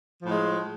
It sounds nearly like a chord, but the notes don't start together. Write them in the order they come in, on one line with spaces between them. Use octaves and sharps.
F3 A2 G#3